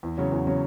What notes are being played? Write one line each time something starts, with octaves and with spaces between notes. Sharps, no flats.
E2
C#3 F#3 C#4
E2
C#3 F#3 C#4